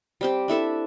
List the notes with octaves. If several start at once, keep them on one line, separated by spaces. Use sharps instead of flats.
G3 C4 G4
D4 E4 A4 E5